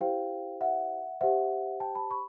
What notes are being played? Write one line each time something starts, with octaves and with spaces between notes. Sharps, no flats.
E4 G4 C5 F5 G5
E5 F#5
G4 C5 E5 F#5
G5 A5
A5 B5
B5 C#6